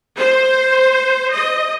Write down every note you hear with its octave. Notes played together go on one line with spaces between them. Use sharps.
C5
D#5